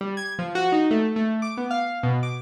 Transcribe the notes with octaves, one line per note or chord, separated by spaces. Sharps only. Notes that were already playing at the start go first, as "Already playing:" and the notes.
G3
G#6
F3
F#4
D#4
A3
A3
D6
B3
F5
B2
D6